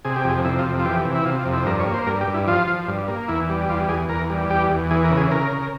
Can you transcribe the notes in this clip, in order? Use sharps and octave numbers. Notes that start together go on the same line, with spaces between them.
C3 G#4
G4
F2 G#4
C3 E4
F4
F2
F4
E3 G4
C3
E4
C3 F4
F4
F2
E4
G2 A#4
C#5
A#3
C5
G2 A#4
G4
G2
E4
F3 F4
F3
G2
A#3
E2 E4
G3
E2 F4
E2 G#4
E2 A#4
G3
E2 G4
E2
E3 G#4
A#4
C#3
G#4
C#3 A#4
C#3